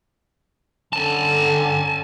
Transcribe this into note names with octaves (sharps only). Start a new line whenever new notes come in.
D3 C#4 A4 G#5 A5